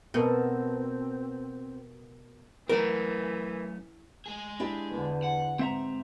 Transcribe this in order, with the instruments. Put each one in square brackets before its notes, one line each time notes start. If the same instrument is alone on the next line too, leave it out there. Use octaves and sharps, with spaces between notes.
[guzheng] B2 [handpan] B3 A4 A#4 [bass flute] C4
[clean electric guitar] F#2 A3 C#4 [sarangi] E3 [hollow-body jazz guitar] A#4
[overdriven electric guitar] G#3 G#4
[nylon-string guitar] D4 E4 G4
[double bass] E2 D3
[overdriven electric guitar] F#5
[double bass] G#2 [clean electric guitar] C4 E5 A#5